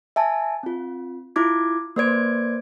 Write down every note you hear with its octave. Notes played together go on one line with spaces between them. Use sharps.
E5 G#5 A5
C4 F4
E4 F4 D6 G#6
A#3 B4 C5 D5 G#6 D7